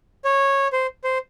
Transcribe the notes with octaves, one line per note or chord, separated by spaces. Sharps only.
C#5
C5
C5